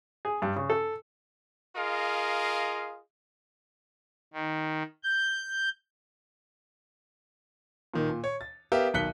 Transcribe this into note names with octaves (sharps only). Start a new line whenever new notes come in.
G#4
G2
C#3
A4
F4 G#4 A#4 D#5 F5
D#3
G6
A#2 D#3
A#2
C#5
A6
B3 G4 A#4 E5 F5
B1 D#3 F#6 B6 C#7 G7